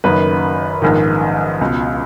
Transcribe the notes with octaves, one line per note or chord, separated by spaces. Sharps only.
F#1 F#2 D#3 B4
A#1 G#2 D#3
C#2 B2